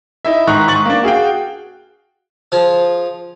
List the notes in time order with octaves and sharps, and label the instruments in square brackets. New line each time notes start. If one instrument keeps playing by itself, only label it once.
[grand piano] D#4 E4 E5
G#2 D#3 A#5 C#6 F#6
G#2 C#6 A6 F#7
A#3 D4
F#4 G#4 F5 G5
[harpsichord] F3 F4 G#4